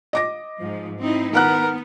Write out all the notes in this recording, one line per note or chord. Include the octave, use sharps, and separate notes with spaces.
D#5 D6 A#6
G#2 F3
C4 D#4 E4
D#3 B3 A#4 F#5 F#6